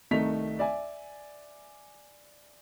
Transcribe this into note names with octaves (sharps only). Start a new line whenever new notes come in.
C2 D#3 A3 D#4 B6 F7
D5 E5 G#5